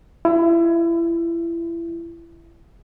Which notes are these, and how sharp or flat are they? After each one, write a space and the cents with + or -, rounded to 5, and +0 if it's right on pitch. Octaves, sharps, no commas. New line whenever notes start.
E4 +30 D#5 +25